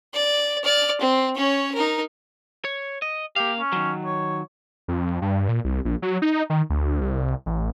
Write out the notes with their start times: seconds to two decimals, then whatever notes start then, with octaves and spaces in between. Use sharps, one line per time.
0.14 D5
0.64 D5 F6
1.01 C4
1.35 C#4 C#5
1.74 D#4 A#4
2.65 C#5
3.02 D#5
3.36 A#3 G4 F5
3.60 C#4
3.72 D#3 F#3
4.05 C#5
4.88 F2
5.22 G2
5.49 A#2
5.65 C2
5.85 A#1
6.02 F#3
6.22 D#4
6.50 D#3
6.70 D2
7.01 C2
7.46 A1